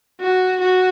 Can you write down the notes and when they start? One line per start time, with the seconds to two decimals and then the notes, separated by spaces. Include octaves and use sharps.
0.21 F#4
0.61 F#4